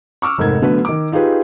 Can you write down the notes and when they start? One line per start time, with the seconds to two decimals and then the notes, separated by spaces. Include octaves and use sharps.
0.22 C#6 D6 E6 F6
0.38 F1 G#2 A#4 G#6
0.62 D3 F#3 A3 B3 B4
0.85 D#3 D6
1.12 D#4 F4 G4 G#4 B4